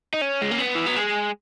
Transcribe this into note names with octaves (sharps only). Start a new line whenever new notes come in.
D#4
C#4
G#3
A#3
B3
E3
F#3
G#3